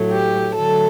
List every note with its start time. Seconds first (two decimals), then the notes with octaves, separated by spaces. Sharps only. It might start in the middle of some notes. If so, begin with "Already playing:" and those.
Already playing: A2 F#3 A3
0.11 G4
0.56 D3 F#3 A3 A4